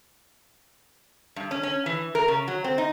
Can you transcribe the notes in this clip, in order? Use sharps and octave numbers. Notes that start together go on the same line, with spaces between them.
G2
C#4
C#4
E3
A#4
C#3
F#3
C4
D#4